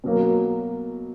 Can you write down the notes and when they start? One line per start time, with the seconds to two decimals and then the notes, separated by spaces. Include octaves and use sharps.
0.04 B2 F#3 A#3